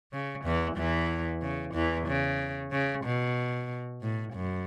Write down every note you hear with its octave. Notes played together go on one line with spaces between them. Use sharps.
C#3
E2 E3
E2 E3
C#3
E2 E3
C#3
C#3
B2
A2
F#2